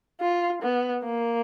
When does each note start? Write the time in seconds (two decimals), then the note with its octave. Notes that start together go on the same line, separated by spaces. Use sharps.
0.21 F4
0.62 B3
1.04 A#3